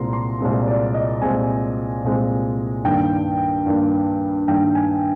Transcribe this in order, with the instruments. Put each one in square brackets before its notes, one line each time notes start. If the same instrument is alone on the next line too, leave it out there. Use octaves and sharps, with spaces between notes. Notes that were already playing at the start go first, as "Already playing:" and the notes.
Already playing: [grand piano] C2 A#2 G#3 C4 A#5 C6
C6
C2 A#2 G#3 C4
D5
D#5
C2 A#2 G#3 C4 G#5
C2 A#2 G#3 C4
G2 D#3 A#3 G5
G2 D#3 A#3
G2 D#3 A#3 G5
G#5